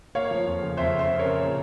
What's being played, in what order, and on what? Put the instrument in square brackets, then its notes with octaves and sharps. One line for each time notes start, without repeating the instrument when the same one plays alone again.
[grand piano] A#3 C#5 F5
F3
F2
C#3
F2 C5 E5
C#3
C5 E5
C#3
A#4 C#5
C#3
A#2